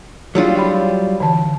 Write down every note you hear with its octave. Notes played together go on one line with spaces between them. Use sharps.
F#3 G3 D4 E4 F4 G#4
F5 G5 B5
D3 E3 A5